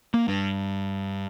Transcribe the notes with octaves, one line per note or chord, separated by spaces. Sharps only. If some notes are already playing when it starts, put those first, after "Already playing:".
A#3
G2